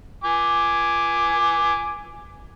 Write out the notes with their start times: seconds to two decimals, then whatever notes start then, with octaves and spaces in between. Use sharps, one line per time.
0.24 G#5 D6